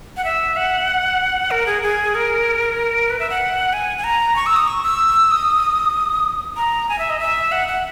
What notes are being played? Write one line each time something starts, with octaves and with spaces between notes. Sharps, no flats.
F#5
E5
F#5
A#4
G#4
G#4
A#4
B4
E5
F#5
G#5
G#5
A#5
C#6
E6
D#6
C#6
E6
D#6
A#5
G#5
E5
D#5
E5
F#5
F#5